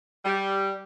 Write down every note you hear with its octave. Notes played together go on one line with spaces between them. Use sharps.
G3